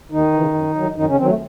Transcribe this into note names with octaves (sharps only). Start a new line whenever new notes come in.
D#2 D#3 D#4
C#3 E3
F#2
D#3 F#3
F#2 D#3 D#4
C#3 C#4
D#3 F#3 C4
A3